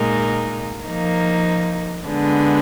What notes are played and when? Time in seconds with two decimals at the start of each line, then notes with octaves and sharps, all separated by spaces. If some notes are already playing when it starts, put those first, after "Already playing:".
Already playing: A#2 G#3 D#4 A#4
0.86 F3 A#3 D#4
2.08 D3 G#3 B3 D4